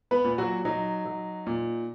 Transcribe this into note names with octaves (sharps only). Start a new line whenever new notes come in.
B3 B4
A#2
F#3 F#4
F#3 D#4
F#3
A#2